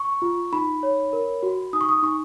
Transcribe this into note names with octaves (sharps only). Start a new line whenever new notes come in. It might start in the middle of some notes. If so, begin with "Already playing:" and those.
Already playing: C#6
F4
D#4 B5
C#5
A#4
F#4
D#4 D#6
C#6
D#6
D#4 C#6